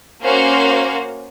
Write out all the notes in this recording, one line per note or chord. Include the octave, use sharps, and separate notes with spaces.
A#3 C#4 F#4 C5 F5